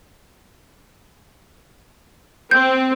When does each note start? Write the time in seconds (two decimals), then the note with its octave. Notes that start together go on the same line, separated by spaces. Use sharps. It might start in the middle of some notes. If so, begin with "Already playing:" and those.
2.51 C4 G6